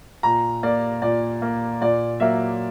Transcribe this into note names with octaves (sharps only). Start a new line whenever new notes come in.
A#2 A#5
A#3 D5
A#2 D5
A#3
A#2 D5
F#3 A#3 E5